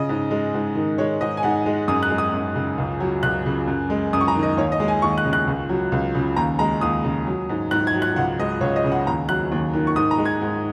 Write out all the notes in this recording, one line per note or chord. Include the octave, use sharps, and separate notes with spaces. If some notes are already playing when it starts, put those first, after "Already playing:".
Already playing: C#3 D#5
G#2
G#3
G#2
D#3
G#3 C#5
G#2 D#5
G#5
G#2 F#5
G#3
F#2 D#6
F#6
G#3
D#6
F#2
C#3
C#2
F#3
C#2 F#6
C#3
F#2
G#3
F#2 D#6
C#6
A#5
D#3
D#5
D#2 C#5
D#5
G#3
G#5
D#2 C#6
F#6
C#3
F#6
C#2
F#3
C#2
C#3
D#2 A#5
G#3 A#5
D#2 D#6
C#3
F#3
G#2
G#2 F#6
G#6
F#3
F#6
C#2 F#5
G#3 D#5
C#2 C#5
D#5
C#3
F#5
D#2 A#5
F#3 F#6
D#2
D#3
C#6
G#2 D#6
A#5
G#3
G#6
G#2